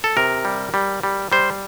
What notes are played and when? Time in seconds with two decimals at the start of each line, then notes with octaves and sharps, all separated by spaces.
0.04 A4
0.17 C3 A#4
0.45 G3
0.74 G3
1.03 G3
1.32 G3 C5